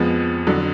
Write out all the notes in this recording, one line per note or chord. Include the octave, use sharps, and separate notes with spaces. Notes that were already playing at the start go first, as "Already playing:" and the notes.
Already playing: F2 F3 G#3 B3
F2 D3 F#3